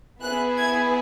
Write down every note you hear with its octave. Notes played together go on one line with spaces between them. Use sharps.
B3 E4 G#4 F#6
G#6